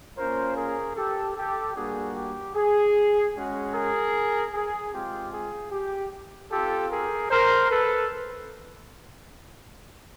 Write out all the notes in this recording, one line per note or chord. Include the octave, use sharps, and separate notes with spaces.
A#3 C#4 F4 A#4 C5
G#4 A#4
G4 A4
G4 A4
G3 A#3 D4 F#4 G#4
G4
G#4
G#3 C#4 F#4
G#4 A#4
G#4
G#3 C4 F4 G4
G#4
G4
C4 F4 G4 A4
G#4 A#4
A#4 C5
A4 B4